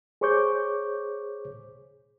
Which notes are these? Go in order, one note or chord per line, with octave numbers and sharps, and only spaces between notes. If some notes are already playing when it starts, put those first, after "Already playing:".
G#4 C5 C#5 C#6 D6 G6